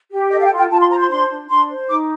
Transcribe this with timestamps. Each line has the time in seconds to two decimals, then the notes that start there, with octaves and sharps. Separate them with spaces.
0.12 G4
0.31 A4 D#5
0.41 F5
0.45 G5
0.52 F4
0.58 G5
0.71 F4 A5
0.81 C6
0.91 C5 A#5
1.00 C6
1.11 D4 C6
1.30 D4
1.50 D4 C6
1.70 C5
1.90 D#4 D6